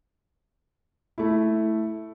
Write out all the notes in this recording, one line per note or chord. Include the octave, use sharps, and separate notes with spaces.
A3 E4